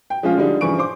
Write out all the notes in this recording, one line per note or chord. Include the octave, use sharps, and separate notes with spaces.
G5
F3 G#3 C#4 F4
D3 F3 G3 D4 D#4 G#4
G2 C#3 E3 F3 C#6 D7
C5 C6 D6